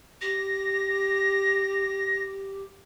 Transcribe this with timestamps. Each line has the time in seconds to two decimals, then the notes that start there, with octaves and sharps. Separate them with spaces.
0.21 G4 A#6